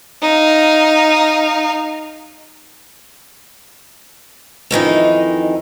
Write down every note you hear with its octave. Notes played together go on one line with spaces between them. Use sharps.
D#4 F5
F2 D#3 E3 D#4